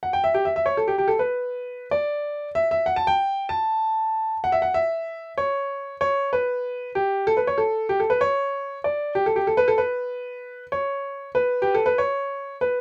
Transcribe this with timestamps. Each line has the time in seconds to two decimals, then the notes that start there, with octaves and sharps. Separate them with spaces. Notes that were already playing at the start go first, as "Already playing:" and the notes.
0.03 F#5
0.13 G5
0.24 E5
0.34 G4
0.45 E5
0.56 E5
0.66 C#5
0.77 A4
0.88 G4
0.98 G4
1.08 A4
1.19 B4
1.91 D5
2.55 E5
2.71 E5
2.86 F#5
2.96 A5
3.07 G5
3.49 A5
4.44 F#5
4.52 E5
4.62 F#5
4.74 E5
5.38 C#5
6.01 C#5
6.33 B4
6.95 G4
7.27 A4
7.37 B4
7.47 C#5
7.58 A4
7.89 G4
8.00 A4
8.10 B4
8.21 C#5
8.84 D5
9.15 G4
9.26 A4
9.36 G4
9.47 A4
9.57 B4
9.68 A4
9.78 B4
10.72 C#5
11.35 B4
11.62 G4
11.74 A4
11.86 B4
11.98 C#5
12.61 B4